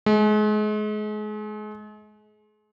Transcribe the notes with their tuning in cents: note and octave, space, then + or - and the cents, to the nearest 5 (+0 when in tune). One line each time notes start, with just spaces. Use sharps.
G#3 +35